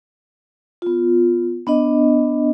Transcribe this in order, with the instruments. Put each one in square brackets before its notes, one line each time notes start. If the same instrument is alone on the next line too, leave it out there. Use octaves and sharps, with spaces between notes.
[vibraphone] B3 F4
B3 D4 D#5